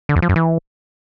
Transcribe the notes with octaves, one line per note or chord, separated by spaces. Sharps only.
D3
E2
F3
F#2
E3